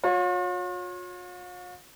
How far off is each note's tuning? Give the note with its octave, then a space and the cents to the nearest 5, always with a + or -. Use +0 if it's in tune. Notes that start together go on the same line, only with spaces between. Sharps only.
F4 +45 C#5 +0